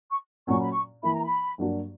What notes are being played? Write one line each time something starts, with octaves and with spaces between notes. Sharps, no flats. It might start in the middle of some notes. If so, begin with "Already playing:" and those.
C#6
A#2 F#3 C#4 C#6
B5
C#6
E3 A#3 E4 B5
A#5
B5
G2 F#3 A#3 D4 F#4